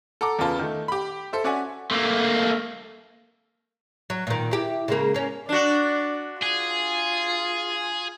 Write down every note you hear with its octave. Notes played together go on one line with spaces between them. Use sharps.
A4 F#5 A5 A#5 D6
E2 C#3 B3 F4 A5
D#3 A3
G4 B5
A4 C5 E5
C#4 F#4 D5 E5 F#5 G#5
A3 A#3
F#3
A#2 D#3
E4 G4
C#3 G#3 A#3
A#3 C#4
D4 F#4 D5
F4 G#4